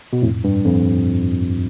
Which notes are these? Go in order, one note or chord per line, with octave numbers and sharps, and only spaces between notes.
B2
F2 A2
G2
F2